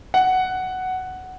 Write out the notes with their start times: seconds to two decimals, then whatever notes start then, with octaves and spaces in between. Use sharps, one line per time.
0.14 F#5